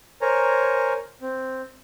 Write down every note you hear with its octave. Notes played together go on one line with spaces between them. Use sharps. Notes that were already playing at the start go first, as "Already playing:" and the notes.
A#4 C5 C#5 G#5 A#5
C4